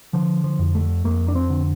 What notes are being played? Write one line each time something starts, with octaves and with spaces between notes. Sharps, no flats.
D3 F3
F3
F2
A3
F2 A#3
D4
C4
D3